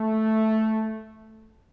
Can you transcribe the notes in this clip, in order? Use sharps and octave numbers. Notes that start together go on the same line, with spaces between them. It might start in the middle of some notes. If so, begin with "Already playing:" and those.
Already playing: A3